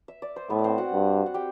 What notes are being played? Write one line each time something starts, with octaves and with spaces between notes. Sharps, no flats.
E5
D5
C5
A2 B3 B4
D5
C4 C5
F#4 F#5
G2
F#5
G4 G5